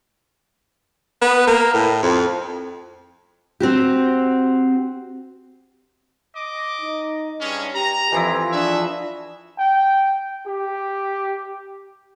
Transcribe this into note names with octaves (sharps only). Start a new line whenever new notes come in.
B3
A#3
A2
F2
C4 F#4 G4
D#5 D6
D#4
G2 G#3 C#4
G4 A#5
F2 E3 F3 E4
D4 F#4 G#4 E5
G5
G4